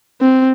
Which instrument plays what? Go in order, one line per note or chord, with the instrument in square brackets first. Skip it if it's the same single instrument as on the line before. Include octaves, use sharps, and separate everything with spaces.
[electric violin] C4